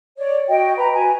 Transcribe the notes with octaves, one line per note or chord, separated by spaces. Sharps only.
C#5 D5
F#4 D#5 G5
B4 A#5
F#4 G#5